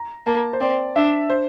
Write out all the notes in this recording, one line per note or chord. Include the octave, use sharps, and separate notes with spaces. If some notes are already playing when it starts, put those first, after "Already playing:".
Already playing: A#5
A#3 A5
C5
C4 D5
D4 E5
C5